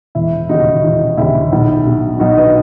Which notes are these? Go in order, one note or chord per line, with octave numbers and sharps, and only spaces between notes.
E1 E4
D#2 C#3 D#4 F#4
E1 D#4
D#2 C#3 E4
B1
B2
B1 D#4 F#4
B4 D#5